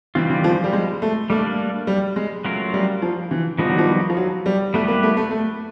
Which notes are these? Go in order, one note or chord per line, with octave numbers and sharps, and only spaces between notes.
D#3 E3 G3 C4 F4
E3
F3
G3
G#3
A3
G3 A3 A#3 D4
G3
G#3
F#3 A3 C#4 F4 A#4
G3
F3
E3
D#3 F3 G3 B3 D#4 F#4
F#3
F3
F3
F#3
G3
G3 A3 B3 E4 G4 B4
A#3
A3
A3
A3